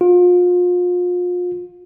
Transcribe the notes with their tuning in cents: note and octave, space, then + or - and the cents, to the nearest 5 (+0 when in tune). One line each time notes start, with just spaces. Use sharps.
F4 +35